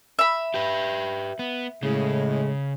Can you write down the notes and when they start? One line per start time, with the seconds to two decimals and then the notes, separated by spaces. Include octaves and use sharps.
0.19 E5 B5
0.54 G4 B4
1.39 B3
1.83 A2 C#3 G#3